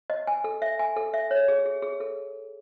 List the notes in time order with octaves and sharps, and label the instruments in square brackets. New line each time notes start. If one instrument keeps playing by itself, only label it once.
[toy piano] D#5
G#5
A4
E5
G#5
A4
E5
C#5
G#4
G#4
G#4
A4